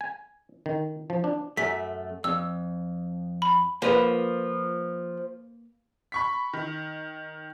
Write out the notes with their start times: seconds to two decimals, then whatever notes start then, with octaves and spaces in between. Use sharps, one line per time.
0.01 G#5
0.66 D#3
1.10 F3
1.24 D4
1.57 F#2 A3 B6
2.24 F2 E6
3.42 B5
3.82 F3 A#3 B4
6.12 B5 C#6 B6
6.53 D#3